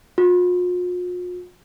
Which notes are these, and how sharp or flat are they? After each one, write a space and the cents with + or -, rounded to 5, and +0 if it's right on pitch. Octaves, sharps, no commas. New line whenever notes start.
F4 +45